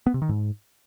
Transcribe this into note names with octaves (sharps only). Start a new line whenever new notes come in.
B3
C3
D#3
G#2